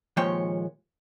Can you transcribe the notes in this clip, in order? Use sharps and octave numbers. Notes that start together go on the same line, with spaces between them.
D#2 A#2 F3 G#3 C#5 G5